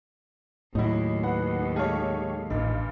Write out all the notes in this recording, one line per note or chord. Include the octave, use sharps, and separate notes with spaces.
D#2 A2 F#3 D#4 E4
B4 F#5
G#3 G4 A4 C#5 F5
A1 G2 A#2 D#4